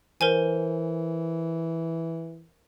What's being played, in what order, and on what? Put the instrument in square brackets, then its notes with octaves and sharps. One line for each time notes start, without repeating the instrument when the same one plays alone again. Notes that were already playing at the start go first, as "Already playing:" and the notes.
[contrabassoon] E3 [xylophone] A#4 C5 G#5